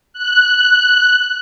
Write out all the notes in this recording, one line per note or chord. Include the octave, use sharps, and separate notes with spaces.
F#6